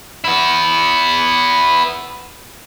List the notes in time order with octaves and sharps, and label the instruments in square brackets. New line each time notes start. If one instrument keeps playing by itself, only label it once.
[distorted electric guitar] B3 E4